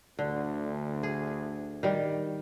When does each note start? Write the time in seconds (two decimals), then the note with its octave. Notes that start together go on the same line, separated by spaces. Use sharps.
0.19 D2 D3
1.03 G#4
1.83 D#3 G3